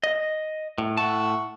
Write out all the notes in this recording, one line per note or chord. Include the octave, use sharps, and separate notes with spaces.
D#5
A2
A2 E5 F#5 A5 C#6